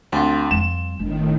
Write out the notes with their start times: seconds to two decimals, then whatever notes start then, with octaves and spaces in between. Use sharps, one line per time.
0.13 D2 C4 F4
0.51 F2 G3 E7
0.99 G1 A2 D3 D#3